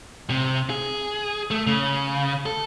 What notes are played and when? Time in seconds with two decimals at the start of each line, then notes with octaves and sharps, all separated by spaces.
0.30 C3
0.70 G#4
1.51 A3
1.67 C#3
2.46 A4